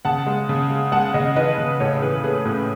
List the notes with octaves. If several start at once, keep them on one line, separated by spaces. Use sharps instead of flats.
C#3 F#5 A5
G#3
C#3
G#3
G#3 F#5 A5
C#3 D#5 F#5
E3 B4 D#5
C#3
A2 A4 C#5
E3 G#4 B4
A3 G#4 B4
A2 C#4